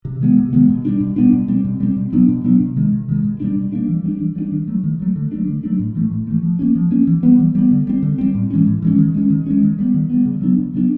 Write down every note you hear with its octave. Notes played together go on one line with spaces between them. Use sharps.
C3
D#3 G#3 B3
C3
D#3 G#3 B3
B2
G3 B3 D4
B2
G3 B3 D4
B2
G3 C4
B2
G3 C4
B2
F#3 B3 D4
B2
F#3 B3 D4
C3
D#3 G#3
C3
D#3 G#3
B2
G3 A#3 D4
B2
G3 A#3 D4
E3
G3 B3 D4
E3
G3 B3 D4
D#3
F#3 A3
D#3
F#3 A3
D3
F#3 A3 D4
D3
F#3 A3 D4
A2
E3 A3
A2
E3 A3
F3
A#3 C#4
F3
A#3 C#4
E3
G3 B3
E3
G3 B3
D3
G3 C4
D3
G3 C4
A2
E3 G#3 C#4
A2
E3 G#3 C#4
D#3
G#3 C#4
D#3
G#3 C#4
D#3
G3 B3
D#3
G3 B3
C#3
F#3 B3 D4
C#3
F#3 B3 D4